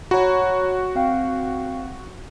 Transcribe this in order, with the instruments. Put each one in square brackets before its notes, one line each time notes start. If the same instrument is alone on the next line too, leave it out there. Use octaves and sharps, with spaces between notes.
[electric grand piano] F#4 [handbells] C#5 A#5 B5
[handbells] C4 F5 G5